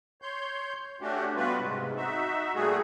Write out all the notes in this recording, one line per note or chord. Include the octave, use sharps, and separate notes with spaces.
C#5 C6 G6
A3 C#4 D4 F#4 G4
B2 G3 B3 F4 F#4 B4
G#2 C3 G#3
D#4 F#4 E5
A#2 G3 A3 F#4 G#4